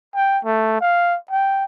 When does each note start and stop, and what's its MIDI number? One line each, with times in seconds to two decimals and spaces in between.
0.16 0.39 79
0.45 0.79 57
0.81 1.17 77
1.31 1.65 79